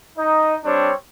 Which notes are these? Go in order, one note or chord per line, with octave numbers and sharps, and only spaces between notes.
D#4 D#5
G3 C4 D4 C#5